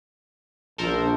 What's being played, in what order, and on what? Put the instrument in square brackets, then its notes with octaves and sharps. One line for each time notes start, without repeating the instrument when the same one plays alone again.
[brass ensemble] A#1 [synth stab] A4 A#4 C5